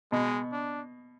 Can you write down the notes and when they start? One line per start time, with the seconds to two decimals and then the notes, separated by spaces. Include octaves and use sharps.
0.12 B2 G#3
0.52 D4